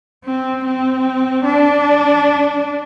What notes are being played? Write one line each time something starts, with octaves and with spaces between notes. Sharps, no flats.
C4
C4
D4